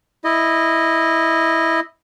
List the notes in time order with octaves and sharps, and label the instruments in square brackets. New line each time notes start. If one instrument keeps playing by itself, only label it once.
[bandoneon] E4 D#5